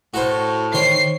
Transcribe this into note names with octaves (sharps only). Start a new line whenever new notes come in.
A2 F#4 A4 C5
D#3 C5 C#5 G5 C7